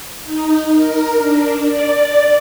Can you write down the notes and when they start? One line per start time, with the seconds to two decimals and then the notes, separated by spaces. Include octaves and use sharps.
0.23 D#4
0.74 A#4
1.15 D4
1.65 D5